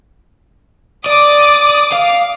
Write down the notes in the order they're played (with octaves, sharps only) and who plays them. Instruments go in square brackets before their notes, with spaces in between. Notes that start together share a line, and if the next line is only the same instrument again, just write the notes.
[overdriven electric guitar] D5 [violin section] D6 D#6
[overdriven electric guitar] F5